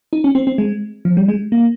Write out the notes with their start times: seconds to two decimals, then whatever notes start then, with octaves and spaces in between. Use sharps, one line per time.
0.13 D#4
0.24 C#4
0.35 C4
0.47 C4
0.58 G#3
1.05 F3
1.17 G3
1.28 G#3
1.52 A#3